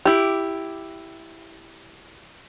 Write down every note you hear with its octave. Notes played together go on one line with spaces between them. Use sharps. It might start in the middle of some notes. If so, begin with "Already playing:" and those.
E4 G4